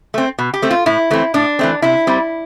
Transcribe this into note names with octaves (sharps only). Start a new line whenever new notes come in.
A3 C4
B2
G4
A3 C4
F4
A2 E4
E3 A3 C4
A2 D4
E3 A3 C4
C3 E4
G3 C4